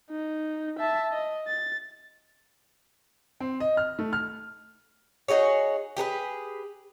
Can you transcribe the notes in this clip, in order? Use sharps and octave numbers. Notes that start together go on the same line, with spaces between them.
D#4
E5 A5
D#5
A6
C4
D#5
F6
A3
F6
D#4 F#4 G#4 C#5
G4 G#4 A#4 B4